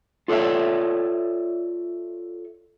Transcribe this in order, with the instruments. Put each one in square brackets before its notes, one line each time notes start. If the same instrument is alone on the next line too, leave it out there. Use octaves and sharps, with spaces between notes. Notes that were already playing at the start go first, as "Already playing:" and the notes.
[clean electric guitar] F4 A4 C#5 D5 E5